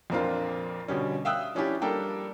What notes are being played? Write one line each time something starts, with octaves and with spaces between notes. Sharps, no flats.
F2 A#2 A#3 C4 D4 F4
B2 D3 G3 C#4
E5 F5 G5 D#6 E6 F#6
F3 C#4 D4 E4 G4
G3 A#3 D4 A4 G5